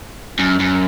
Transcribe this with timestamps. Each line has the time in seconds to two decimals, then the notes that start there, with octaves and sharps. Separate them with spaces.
0.39 F#2
0.59 F#2